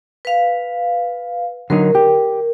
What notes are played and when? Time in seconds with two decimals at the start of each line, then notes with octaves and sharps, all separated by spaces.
0.25 B4 F5
1.70 D3 F#3 D#4 A#4
1.95 G4